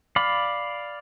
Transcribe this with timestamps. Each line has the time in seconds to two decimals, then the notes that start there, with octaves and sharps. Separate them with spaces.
0.16 D5 F5 B5